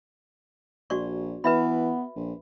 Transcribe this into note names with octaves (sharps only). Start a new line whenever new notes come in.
A#1 F#4 D5 C#6
E3 B3 B4 E5 B5
A#1